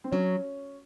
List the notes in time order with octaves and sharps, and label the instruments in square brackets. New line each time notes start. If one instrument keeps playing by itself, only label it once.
[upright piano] C4
[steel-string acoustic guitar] F#3 [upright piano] C#4